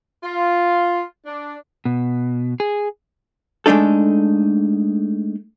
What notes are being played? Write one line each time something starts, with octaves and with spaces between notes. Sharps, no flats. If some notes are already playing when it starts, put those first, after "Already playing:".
F4
D4
B2
G#4
G#3 A3 D4 D#4 A4